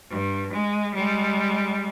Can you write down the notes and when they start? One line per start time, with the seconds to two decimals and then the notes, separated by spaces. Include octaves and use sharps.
0.11 G2
0.52 G#3
0.94 G3 G#3